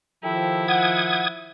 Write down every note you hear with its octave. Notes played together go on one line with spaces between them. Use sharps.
D#3 F3 E4 G4 A4 G5
F#5 D#6 G#6